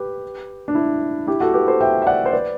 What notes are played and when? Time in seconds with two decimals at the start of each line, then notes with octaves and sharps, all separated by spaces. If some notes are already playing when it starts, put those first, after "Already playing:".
Already playing: G4 B4
0.68 D4
0.75 E4
1.27 E4 G4
1.41 F#4 A4
1.54 G4 B4
1.67 A4 C5
1.81 E5 G5
2.02 E5
2.07 D5 F#5
2.26 C5
2.32 B4 D5